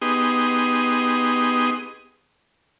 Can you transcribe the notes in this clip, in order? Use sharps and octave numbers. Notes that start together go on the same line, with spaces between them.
B3 D#4 G4 G#4 C6 D#6